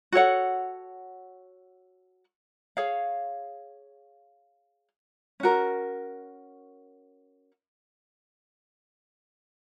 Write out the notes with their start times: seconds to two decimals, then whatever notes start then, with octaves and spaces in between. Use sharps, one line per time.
0.12 F#4 A4 C#5 F#5
2.77 G#4 C#5 F5
5.40 C#4 F#4 A#4